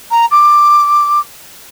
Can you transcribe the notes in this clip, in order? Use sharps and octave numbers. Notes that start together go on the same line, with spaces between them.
A#5
D6